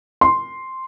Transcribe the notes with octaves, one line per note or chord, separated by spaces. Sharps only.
C6